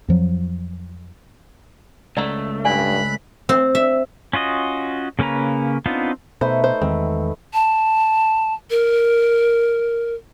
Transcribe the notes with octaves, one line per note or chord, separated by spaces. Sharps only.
F2 F3 F#3
C#2 A3 D5 F#5 A#5
G2 D5 F#5 G#5 B5 F#6
C4
E5
C#4 F4 F#4 D#5
C#3 A#3 C#4 B4 A#5
B3 C4 D4 D#4 F4
B2 A3 D#4 B4 C5
C5
E2 D#3 G#3 C4
A5
A#4